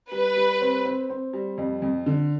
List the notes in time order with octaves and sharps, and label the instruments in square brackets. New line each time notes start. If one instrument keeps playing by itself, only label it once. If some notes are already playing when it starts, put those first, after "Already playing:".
[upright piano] G3 [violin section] B4
[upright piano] G3
C4
C4
C4
G3
F2
F2
D3